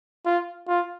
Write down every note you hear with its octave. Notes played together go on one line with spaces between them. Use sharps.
F4
F4